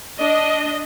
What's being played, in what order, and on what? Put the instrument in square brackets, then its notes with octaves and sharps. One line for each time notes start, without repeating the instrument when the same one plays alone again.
[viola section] D4 D#5